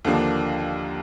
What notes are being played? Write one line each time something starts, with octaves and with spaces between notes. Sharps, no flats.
D#2 D3 F3 A#3 D4